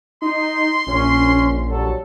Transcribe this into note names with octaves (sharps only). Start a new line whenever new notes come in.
D#4 C6
A#1 C#4
F#3 G3 A4